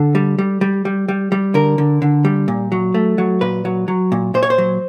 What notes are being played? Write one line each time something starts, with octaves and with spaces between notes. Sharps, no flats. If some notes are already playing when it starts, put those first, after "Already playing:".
Already playing: D3 A4
G3
G3
G3
G3
G3
G3
D3 A#4
D3
D3
G3
A#2
F#3
A3
F#3
A#2 B4
F#3
F#3
A#2
A#2 C5
C#5
C5
F#3